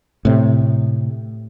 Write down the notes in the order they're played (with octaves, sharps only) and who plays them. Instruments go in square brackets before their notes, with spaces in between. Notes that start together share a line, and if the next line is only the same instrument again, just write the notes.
[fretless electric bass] A2 C3